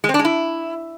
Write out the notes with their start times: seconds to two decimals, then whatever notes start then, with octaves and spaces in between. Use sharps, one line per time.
0.04 G#3
0.09 C4
0.14 D4
0.19 G#3
0.25 E4